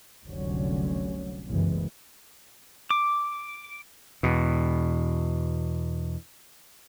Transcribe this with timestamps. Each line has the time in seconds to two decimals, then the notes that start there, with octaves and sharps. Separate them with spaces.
0.25 F1 C2 D3 F#3 C#4
1.47 F#1 C2 G2 C3 E3 G#3
2.91 D6
4.23 E2 B2